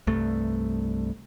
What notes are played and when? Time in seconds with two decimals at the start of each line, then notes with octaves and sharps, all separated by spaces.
0.07 C2 G2 A3